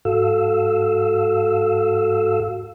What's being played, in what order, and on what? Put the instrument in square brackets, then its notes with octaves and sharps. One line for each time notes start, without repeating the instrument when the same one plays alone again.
[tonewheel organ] G#2 F#4 A4 F5 E6